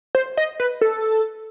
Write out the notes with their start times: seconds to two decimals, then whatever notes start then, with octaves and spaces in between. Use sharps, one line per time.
0.15 C5
0.37 D#5
0.60 B4
0.81 A4